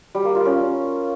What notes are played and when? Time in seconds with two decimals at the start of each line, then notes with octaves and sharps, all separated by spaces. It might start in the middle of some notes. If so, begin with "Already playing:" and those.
0.15 G3
0.25 A#3
0.35 F4
0.45 C#4